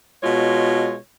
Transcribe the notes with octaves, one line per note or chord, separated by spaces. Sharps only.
B2 G#3 F4 C#5